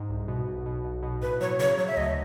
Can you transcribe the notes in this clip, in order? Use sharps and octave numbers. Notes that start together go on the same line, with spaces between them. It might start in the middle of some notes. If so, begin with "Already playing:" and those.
Already playing: G#2
C2
B2
B1
B2
B1
B2
A2 B4
F#3 C#5
C#3 C#5
F#3 C#5
E5
D2 D#5